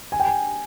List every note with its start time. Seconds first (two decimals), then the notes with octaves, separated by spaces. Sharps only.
0.12 G#5
0.20 G5
0.27 G#5